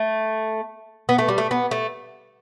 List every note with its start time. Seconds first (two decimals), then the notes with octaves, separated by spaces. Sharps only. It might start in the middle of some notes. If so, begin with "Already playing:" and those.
Already playing: A3
1.09 B3
1.18 A3
1.28 G3
1.38 A3
1.51 B3
1.71 A3